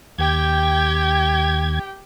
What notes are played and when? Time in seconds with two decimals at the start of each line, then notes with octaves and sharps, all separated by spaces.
0.19 D#2 G4 G5 G#6